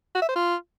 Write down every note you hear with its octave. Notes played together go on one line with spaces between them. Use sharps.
F#4
E5
C5
F4